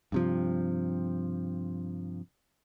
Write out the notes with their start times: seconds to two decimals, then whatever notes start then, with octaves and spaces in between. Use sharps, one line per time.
0.12 G2 C3 F3